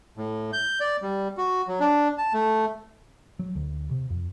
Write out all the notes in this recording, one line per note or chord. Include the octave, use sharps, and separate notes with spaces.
A2
G6
D5
G3
F#4
F#3
D4
A5
A3
F#3
D2
C3
F2